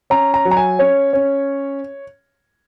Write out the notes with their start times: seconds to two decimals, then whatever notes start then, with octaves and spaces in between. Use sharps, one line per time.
0.10 C#4 A#5
0.34 A#5
0.45 F#3
0.51 A#5
0.57 G#5
0.79 C#4 C#5
1.13 C#4